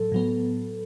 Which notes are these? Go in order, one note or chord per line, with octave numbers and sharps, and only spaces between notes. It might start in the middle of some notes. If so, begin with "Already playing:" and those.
Already playing: A2 F#3 A4
A2 F#3 B3